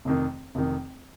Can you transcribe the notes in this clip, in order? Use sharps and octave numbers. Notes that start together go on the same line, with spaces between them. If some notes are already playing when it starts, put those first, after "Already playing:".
F1 F2 D#3
F1 F2 D#3